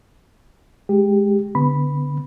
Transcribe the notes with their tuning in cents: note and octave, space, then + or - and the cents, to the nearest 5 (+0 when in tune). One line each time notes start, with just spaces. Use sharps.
G#3 +5 G4 +15
D3 -20 B3 +5 B5 +0